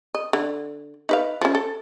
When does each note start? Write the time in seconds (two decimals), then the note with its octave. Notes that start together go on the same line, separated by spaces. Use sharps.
0.15 D#5
0.33 D3
1.09 D#4 B4 F5
1.41 F3 C#4
1.55 A4